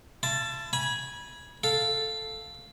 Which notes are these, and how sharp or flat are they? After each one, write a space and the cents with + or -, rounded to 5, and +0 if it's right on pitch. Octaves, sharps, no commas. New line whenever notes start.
E4 +45 A5 +0
G#5 +0 B5 -30
A4 +0 F5 +0